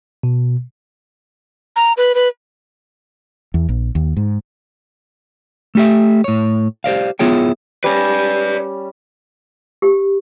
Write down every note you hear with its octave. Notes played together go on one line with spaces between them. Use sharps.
B2
A#5
B4
B4
E2
A#1
D#2
G#2
A3 G4 E5
A2 C#5
G4 C5 D5 F5
B3 E4 F4 G#4 C#5 G5
G3 C#4 B4 D5
G4